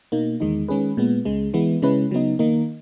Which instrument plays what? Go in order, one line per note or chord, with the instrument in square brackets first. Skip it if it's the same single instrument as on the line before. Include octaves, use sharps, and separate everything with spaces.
[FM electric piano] B2 A#3 D#4
E2 D#3 G#3 D#4
D#3 G#3 C#4 G#4 B4
A#2 G#3 B3
C#2 C#3 G#3
E3 G#3 B3 E4
C#3 G#3 C#4 E4 B4
C#3 F#3 B3 D#4
D#3 A#3 D#4